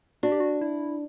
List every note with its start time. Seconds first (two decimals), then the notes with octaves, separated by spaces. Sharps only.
0.23 D4 F#4
0.32 G4
0.40 F#4
0.61 E4